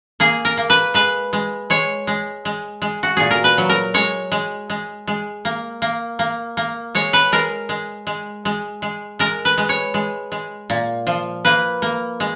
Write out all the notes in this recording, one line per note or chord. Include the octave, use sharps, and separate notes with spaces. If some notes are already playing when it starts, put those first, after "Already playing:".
A#3 G#4
A#4
A#3
B4
G#3 B4
G#3
G#3 C#5
G#3
G#3
G#3
F#4
A#2 G#4
A#4
B4
F#3
A#4
G#3 C#5
G#3
G#3
G#3
A#3
A#3
A#3
A#3
G#3 C#5
B4
G#3 A#4
G#3
G#3
G#3
G#3
G#3 A#4
B4
G#3
C#5
G#3
G#3
A#2
F3
A#3 B4
A#3
G#3